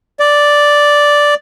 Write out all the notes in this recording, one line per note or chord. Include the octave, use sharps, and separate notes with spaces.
D5